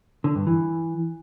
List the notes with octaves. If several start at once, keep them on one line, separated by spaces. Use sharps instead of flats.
D3
G2
E3